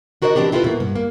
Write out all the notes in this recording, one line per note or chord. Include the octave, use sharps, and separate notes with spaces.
D4 F#4 A#4 C5 C#5 D#5
E3 A#3 C4 D4 G4
C4 E4 F4 A4 B4
B2 A#3
G2
A#3